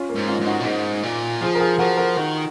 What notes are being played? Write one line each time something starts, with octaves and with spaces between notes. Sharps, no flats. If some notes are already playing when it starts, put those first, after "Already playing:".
Already playing: C#4 F4
A#3
G#2
C#4 F4
G#2
D#4 F#4
A#2
G#2
A#2
F3 F4 G#4
A#4
F4 G#4
F3 F#4 A#4
F#4 A#4
D#3 F#4 A#4